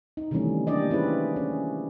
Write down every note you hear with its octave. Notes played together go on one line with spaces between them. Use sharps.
D#4
C3 D#3 E3 G3 A3 C#4
A#3 D4 G4 D5 D#5
C#4 E4 G#4 B4 C5
C#4